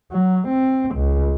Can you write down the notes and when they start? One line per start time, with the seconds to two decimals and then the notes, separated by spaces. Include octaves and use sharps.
0.11 F#3
0.48 C4
0.95 C#2